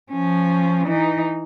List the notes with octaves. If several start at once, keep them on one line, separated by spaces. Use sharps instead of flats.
F3 C#4
E3 D#4